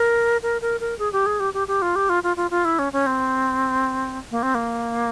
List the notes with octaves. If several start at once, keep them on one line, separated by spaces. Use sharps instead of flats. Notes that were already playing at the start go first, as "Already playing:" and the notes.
Already playing: A#4
A#4
A#4
A#4
G#4
G4
G#4
G4
G4
G4
F4
G4
F4
F4
F4
F4
E4
C#4
C#4
C4
A#3
C4
A#3